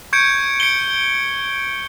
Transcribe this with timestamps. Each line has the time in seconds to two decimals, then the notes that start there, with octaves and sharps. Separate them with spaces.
0.13 C#6 G6 G#6 C#7 D7
0.60 C#7 D7 G7